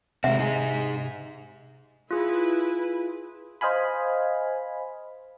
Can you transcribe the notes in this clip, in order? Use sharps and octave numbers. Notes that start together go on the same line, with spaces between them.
C3 G#3 C4 E5
D#4 G#4
E4 F4 G#4 B4
C5 D#5 F5 G#5 B5